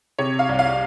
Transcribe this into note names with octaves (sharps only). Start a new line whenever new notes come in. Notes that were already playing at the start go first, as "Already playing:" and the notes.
C3 C#5
F5
C2
F5